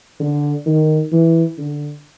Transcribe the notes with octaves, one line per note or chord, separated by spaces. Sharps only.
D3
D#3
E3
D3